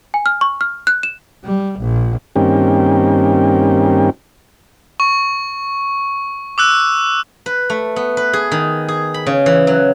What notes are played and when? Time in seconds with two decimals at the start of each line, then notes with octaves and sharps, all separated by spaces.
0.14 G#5
0.26 F6
0.41 C#6
0.61 F6
0.87 F#6
1.03 E7
1.45 G3
1.80 A#1
2.36 G2 D#3 A#3 C4 C#4 G4
5.00 C#6
6.58 D6 E6 F#6
7.46 B4
7.70 A3
7.96 B3
8.17 B4
8.33 G#4
8.52 D#3
8.88 G#4
9.14 B5
9.26 C#3
9.46 E3
9.67 F#3